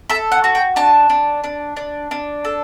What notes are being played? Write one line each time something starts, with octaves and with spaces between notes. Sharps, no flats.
A4 E5
F#5
F#4
G5
D4 A5
D4
D4
D4
D4
A4